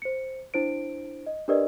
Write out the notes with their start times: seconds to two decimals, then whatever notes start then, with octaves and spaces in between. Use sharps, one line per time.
0.02 C5 C#7
0.54 D4 E4 C5 D7
1.27 D#5
1.48 D4 G4 A#4 B4 D5 D#5